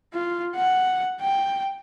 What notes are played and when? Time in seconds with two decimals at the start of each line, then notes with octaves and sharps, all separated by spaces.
0.13 F4
0.55 F#5
1.21 G5